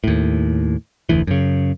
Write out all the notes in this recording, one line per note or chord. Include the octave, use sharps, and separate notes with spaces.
D#2 A2
F1 D2 E3
F#2 C#3